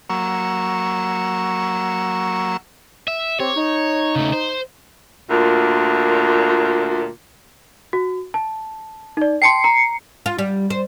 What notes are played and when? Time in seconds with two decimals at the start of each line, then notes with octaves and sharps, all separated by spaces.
0.10 F#3 A#3 C#6 E6
3.08 E5
3.40 C4 G4 C#5
3.56 D#4
4.16 C#3 A3
4.33 C5
5.31 D2 A#2
7.93 F#4
8.34 A5
9.17 D#4 D5
9.42 G5 A5 C6 C7 C#7
9.64 A#5
10.26 F4
10.38 G3
10.70 C5